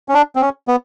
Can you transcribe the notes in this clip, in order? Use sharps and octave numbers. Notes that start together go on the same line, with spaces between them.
C#4
D4
C4
C#4
B3